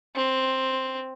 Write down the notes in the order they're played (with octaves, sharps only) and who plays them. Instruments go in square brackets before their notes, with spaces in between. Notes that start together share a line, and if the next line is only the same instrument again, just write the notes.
[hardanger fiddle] C4